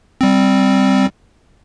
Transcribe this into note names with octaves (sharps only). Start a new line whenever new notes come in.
G3 C4